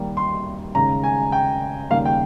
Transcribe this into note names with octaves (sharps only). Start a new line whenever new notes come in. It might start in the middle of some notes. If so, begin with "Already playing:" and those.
Already playing: D#2 D#3 G3 A#3
C6
D#2 C#3 G#3 A#5
G#5
G5
D#2 C#3 G3 A#3 F5
G5